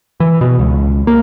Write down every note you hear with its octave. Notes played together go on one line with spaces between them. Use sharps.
E3
B2
C#2
A#3